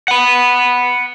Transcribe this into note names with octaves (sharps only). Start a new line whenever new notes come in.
F#5 B5